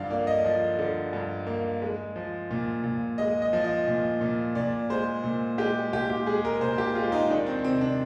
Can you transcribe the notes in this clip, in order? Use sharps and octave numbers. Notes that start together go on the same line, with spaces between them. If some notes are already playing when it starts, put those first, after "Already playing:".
Already playing: G2 D3 F3 D5 F5
A#3 D5
D#5
F3
D3
G2
A#3
G#3
F3
A#2
A#2
G#3 D#5
D#5
F3
D#5
A#2
A#2
A#2 D5
G#3 C5
A#2
G#3 G4
A#2 G4
G4
G#3 G#4
A#4
A#2 C5
G4
G#3 F4
D#4
D#3 D4
C4
C3 C4
D4